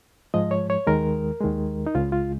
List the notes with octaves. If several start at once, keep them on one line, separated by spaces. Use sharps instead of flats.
G#2 F3 G#3 D#5
C#5
C#5
D#2 D#3 G#3 A#4
D#2 D#3 G#3
D#4
C#2 C#3 G#3 F4
F4